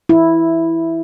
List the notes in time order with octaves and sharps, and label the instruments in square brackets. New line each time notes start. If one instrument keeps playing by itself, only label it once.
[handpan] E4